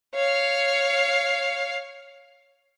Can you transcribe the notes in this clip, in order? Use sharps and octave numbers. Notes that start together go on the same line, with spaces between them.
C#5 F5